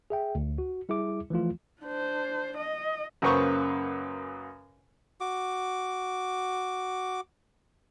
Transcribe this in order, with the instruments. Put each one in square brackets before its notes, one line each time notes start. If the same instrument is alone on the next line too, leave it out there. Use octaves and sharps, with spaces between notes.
[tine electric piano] G#4 E5 G5
D2
F#4
G3 E4 G#4 E5 D6
E3 F3 A3 F4
[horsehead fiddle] D4 C5
D#5
[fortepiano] F#2 C#3 A#3 B4 C5 C#6
[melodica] F#4 D6